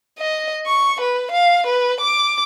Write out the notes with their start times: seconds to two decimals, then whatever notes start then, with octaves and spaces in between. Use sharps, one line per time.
0.19 D#5
0.66 C#6
1.01 B4
1.32 F5
1.67 B4
2.01 D6